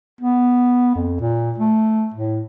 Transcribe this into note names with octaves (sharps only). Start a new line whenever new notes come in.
B3
F2
A#2
A3
A2